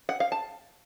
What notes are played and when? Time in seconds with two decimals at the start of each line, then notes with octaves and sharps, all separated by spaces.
0.09 F#5
0.20 F5
0.32 A5